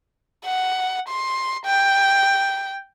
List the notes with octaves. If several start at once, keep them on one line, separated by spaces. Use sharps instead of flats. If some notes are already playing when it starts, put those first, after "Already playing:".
F#5
C6
G5